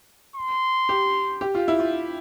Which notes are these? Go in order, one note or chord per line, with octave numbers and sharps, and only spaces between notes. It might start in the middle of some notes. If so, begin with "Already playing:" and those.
C6
G4
G4
F4
E4
F4